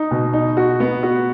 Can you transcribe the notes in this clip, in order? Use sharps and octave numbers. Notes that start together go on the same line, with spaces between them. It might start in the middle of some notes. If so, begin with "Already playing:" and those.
Already playing: D#4
B2
D#4
F#4
B3
F#4